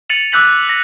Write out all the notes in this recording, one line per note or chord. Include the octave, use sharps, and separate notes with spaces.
A6 C#7 D#7 F7 F#7
D6 E6 F#6 G6 B6 F#7
A#6